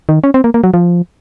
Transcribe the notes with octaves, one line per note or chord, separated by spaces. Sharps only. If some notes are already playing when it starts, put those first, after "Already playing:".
D#3
C#4
C4
A#3
A#3
F#3
F3